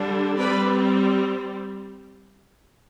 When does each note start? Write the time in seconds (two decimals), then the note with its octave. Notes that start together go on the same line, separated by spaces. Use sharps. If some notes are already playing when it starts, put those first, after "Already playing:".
Already playing: D3 G3 D4
0.37 G3 C4 B4 D5